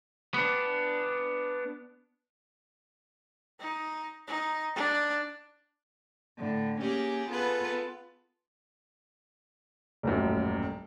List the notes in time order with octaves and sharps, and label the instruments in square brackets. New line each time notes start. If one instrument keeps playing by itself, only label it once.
[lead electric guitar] B3 D4
[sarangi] D#4
D#4
D4
[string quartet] A2 D3
A#3 C#4 G4 G#4
B3 F4 G#4 A4 B4
[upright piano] D#1 A1 F#2